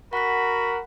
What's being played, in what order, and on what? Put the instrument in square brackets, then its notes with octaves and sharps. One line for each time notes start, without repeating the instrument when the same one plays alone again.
[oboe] F#4 [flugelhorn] A#4 [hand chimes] F#5 B6 [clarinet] B5